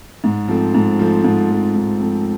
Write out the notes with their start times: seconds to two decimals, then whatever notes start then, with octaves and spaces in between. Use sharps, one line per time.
0.24 G#2
0.48 F3 A3 C4
0.74 G#2
0.99 F3 A3 C4
1.24 G#2
1.50 F3 A3 C4
1.76 G#2
2.00 F3 A3 C4